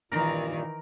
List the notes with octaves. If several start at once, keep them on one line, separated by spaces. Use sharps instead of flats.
G2 A#2 D#3 E3 A#4